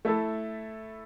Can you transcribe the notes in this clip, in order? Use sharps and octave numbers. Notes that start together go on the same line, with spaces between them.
A3 E4 A4